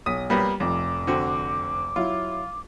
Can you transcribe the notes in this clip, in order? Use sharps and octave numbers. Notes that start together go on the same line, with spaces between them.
B1 D#6 B6 D#7
G3 A#3 B3 B5
F1 F2 D6
D3 C4 F#4
F#3 E4 F4